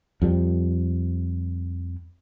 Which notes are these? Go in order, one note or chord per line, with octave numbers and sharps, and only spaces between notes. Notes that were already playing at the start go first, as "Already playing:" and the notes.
F2 F3 G3